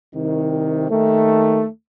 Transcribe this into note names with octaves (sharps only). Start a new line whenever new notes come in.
C2 C3 D#3
D#2 D#3 A3